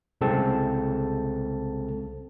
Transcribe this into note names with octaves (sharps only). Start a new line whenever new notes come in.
C2 C#3 G#3 C4 A4 A5